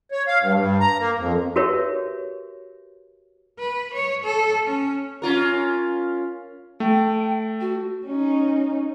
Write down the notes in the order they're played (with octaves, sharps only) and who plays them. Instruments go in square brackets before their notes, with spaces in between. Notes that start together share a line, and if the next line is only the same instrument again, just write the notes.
[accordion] C#5
F5
G2
G2
A#5
A#3
F2
[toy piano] F#4 G4 A#4 B4 C#5 E5
[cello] B4
C#5
A4
C#4
[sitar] C#4 F4 A#4
[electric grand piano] A3 [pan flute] G5
[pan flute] F#4
[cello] C#4 D#4